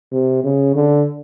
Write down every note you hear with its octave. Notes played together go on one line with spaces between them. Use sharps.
C3
C#3
D3